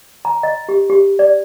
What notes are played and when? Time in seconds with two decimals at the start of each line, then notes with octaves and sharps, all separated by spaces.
0.25 A#5
0.43 D#5
0.69 G4
0.90 G4
1.19 D5